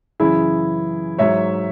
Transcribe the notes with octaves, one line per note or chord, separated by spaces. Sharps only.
F#2 C#3 E3 E4 G#4
G#2 F#3 C#5 E5